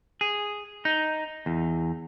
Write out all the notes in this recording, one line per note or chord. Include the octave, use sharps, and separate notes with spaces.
G#4
D#4
E2